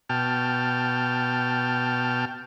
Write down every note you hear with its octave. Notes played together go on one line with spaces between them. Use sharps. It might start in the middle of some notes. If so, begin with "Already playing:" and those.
B2 G5 A5 F6